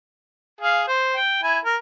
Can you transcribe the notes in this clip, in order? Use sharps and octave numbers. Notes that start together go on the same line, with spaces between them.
G#4 F5
C5
G5
E4 G#5
A#4